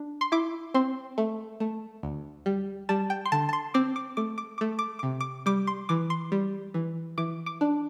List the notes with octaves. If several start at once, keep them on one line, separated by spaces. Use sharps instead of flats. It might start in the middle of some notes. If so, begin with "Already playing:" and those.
Already playing: D4
C6
E4 D6
C4 C6
A3
A3
D2
G3
G3 A5
G5
C6
D3 A5
A5
C6
C4 D6
D6
A3 D6
D6
A3 D6
D6
C3 D6
D6
G3 D6
C6
E3 D6
C6
G3
E3
E3 D6
D6
D4